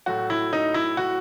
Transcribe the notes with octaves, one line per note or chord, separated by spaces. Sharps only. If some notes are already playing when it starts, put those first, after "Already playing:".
A2 F#3 A3 F#4
E4
D#4
E4
F#4